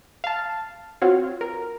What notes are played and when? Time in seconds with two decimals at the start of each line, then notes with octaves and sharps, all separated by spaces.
0.24 F5 A5
1.02 C4 F4 F#4 C#5
1.41 A#4